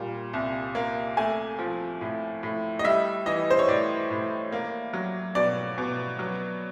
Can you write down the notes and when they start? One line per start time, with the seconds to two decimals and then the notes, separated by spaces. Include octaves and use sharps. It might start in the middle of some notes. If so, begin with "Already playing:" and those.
Already playing: A#2 G3
0.33 C2
0.75 A#3
1.17 A3 G#5
1.59 F3
2.01 A2
2.43 A2
2.79 D#5
2.85 G3 E5
3.26 E3 D#5
3.51 C5
3.59 C#5
3.68 A2 D5
4.11 A2
4.52 A#3
4.93 F#3
5.35 B2 D5
5.78 B2
6.19 F#3